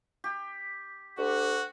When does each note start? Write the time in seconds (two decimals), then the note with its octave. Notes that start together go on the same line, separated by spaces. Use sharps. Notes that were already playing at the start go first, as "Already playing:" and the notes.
0.24 G4
1.18 D2 F#4 G4